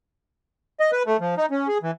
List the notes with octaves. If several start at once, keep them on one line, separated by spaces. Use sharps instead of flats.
D#5
B4
A3
F3
D#4
C#4
G#4
E3